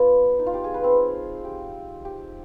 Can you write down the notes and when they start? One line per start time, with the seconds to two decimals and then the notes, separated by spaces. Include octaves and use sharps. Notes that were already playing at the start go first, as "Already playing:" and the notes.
Already playing: B3 F4
0.39 D#4
0.46 F4
0.54 G4
0.64 G#4
0.74 B4
0.84 C4
1.44 G4
2.05 G4